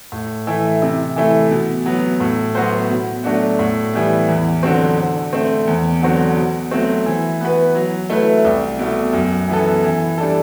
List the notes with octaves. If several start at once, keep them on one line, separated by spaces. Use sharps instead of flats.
A2
E3 A3 E4
C3
E3 A3 E4
B2
F#3 B3
A2
F#3 B3 F#4 C5
B2
F#3 A3 D4 F#4
A2
E3 G3 B3
E2
D3 F#3 C4
D3
A3 C4
E2
D3 F#3 C4 F#4
B2
F#3 A3 C4
E3
B3 F#4 B4
F#3
A3 E4 B4
C2
B2 A3
F#2
E3 B3 E4 A4
E3
G3 D4 A4